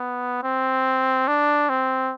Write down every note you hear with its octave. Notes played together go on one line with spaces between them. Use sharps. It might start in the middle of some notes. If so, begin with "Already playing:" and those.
Already playing: B3
C4
D4
C4